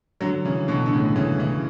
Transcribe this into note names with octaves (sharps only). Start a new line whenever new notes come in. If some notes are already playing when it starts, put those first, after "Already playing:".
D3 F#3
C#3 E3
B2 D3
D3
A2 C#3
C#3 E3
C#3 E3